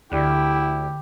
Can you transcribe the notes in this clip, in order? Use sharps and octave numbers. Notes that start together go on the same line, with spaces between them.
D2 D3 E4 G4 D5